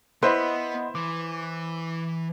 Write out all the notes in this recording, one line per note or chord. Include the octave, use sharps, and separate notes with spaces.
B3 E4 B4 C5 D#5 F#5 B5 C6
E3 D6